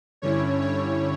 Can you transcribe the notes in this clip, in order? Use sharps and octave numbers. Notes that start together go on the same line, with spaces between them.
G2 D3 G3 C#4 E4 C#5
C#5